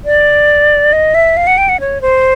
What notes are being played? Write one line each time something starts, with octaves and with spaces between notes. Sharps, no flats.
D5
D#5
E5
F5
F#5
G5
F#5
C#5
C5